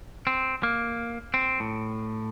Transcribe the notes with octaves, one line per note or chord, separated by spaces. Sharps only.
C4
A#3
C4
A2